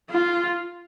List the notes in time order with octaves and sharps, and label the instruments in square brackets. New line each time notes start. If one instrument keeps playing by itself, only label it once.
[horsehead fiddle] F4